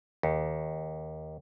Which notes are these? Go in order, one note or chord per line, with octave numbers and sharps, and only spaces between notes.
D#2